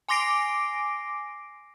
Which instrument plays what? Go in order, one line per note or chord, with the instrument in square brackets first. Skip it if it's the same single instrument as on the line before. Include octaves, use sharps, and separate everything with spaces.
[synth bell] G#5 C6 D6 A#6 C7 D7